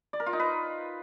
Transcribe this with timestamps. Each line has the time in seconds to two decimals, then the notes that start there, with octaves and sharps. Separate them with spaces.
0.13 D5
0.20 A#4
0.26 F4
0.33 D#4
0.39 B4